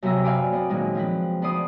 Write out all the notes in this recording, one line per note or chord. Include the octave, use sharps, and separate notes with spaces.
F#2 C3 B3 E5 A#5
D5 F5 G#5 B5 D6
B3 C4 D5
F#2 A#2 D#3 G#3
F3 C4 B4
D2 B3 B4 D5 C6 D#6